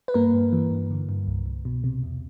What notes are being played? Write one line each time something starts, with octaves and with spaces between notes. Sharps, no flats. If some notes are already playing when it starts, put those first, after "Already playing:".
B4
G2 A#3 A#4
G2
E3
G2
D3
G2
C2
C2
B2
C3
E2